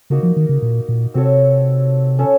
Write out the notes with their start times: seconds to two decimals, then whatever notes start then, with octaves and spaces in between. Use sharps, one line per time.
0.10 C#3 A#3 D#4 F#4 A#4
0.23 F3
0.36 D#3
0.49 C#3
0.62 A#2
0.88 A#2
1.14 C3 C4 F#4 A4 C#5
2.19 C#4 A4 C#5